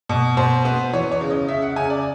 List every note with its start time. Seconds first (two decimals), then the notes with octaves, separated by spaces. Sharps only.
0.09 B2
0.37 B2 C5
0.65 B3
0.93 E3 C#5
1.11 C#5
1.21 C#3
1.30 D#5
1.48 C#3 E5
1.62 F#5
1.76 C#3 G#5
1.90 D5